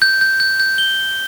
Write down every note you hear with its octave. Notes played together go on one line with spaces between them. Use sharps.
G6
G6
G6
G6
G7